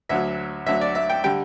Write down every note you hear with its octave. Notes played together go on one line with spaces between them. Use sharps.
D2 D3 F#3 E5
D2 D3 F#3 E5
D5
E5
G5
D3 G3 G5